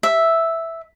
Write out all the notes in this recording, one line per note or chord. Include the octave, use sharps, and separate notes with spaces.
E5